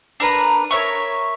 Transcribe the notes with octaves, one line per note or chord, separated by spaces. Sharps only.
D4 A#4 B4 A#5
A#4 C#5 E5 C#6